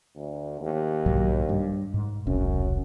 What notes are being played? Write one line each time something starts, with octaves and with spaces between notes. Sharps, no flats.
D2
D#2
B1 G#2 F#3
G2
G#2
E1 C2 F#2 C#4